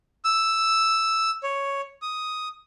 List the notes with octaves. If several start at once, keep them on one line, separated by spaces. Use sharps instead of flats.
E6
C#5
D#6